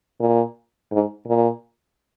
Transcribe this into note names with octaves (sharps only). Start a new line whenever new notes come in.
A#2
G#2
A#2